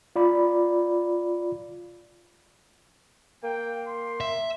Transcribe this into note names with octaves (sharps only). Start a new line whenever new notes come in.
F4 D5 B5
A#3 G5
C6
E5